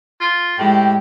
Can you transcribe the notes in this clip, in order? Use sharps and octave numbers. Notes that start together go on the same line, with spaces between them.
F4
A2 G#3 G4